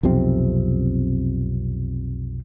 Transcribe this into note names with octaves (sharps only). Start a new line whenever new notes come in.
B1 F2 C3 C4